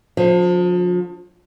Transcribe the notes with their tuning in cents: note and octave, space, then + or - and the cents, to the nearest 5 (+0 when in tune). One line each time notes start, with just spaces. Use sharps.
D3 -30 F3 +40 C5 +0